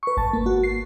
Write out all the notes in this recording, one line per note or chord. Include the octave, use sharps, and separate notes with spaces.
B4 C#6
G#1 A5
A#3
A#3 F#4
C7